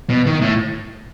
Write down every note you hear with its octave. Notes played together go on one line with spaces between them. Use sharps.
B2
D#3
A2